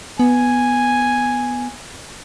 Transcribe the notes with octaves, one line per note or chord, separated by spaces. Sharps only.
B3 G#5